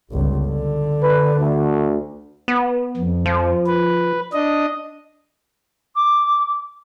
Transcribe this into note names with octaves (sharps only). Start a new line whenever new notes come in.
G1 C#2
D3
B4
D2
B3
F2
F3
B4
D4 D#5
D6